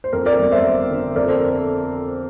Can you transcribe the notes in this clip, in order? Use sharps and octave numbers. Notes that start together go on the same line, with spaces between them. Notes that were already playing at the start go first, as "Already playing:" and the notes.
C5
F2 A#4
A#4 D5
G1
C5 E5
G1
D3
F2 A#4 D5
A4 C5